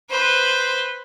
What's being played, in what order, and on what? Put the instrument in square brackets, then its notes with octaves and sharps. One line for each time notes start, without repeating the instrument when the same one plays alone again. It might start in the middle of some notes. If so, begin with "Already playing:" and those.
[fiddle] B4 C5